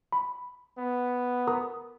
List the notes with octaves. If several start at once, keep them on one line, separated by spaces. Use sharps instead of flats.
B5
B3
A#4 A#5 D#6